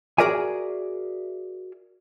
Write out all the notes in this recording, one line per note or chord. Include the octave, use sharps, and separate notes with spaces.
F#4 G#4 A#4 D5 E5 G#5